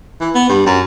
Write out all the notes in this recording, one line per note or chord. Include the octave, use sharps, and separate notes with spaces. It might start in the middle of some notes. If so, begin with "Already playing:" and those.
E3
B3
G2
F#2